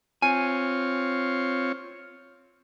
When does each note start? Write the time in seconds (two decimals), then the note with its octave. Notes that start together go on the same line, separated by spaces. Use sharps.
0.22 C4 F4 C#5 G#5